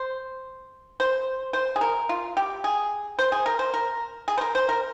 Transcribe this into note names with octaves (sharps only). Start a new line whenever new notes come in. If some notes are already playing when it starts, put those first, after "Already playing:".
Already playing: C5
C5
C5
G#4
A#4
F4
G4
G#4
C5
G#4
A#4
C5
A#4
G#4
C5
A#4
C5
A#4